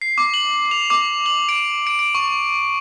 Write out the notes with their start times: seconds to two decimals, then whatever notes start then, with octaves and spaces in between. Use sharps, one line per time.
0.02 C7
0.18 D6
0.34 F#7
0.71 F7
0.90 D6
1.26 F#7
1.49 D7
1.87 D7
1.99 D7
2.15 C#6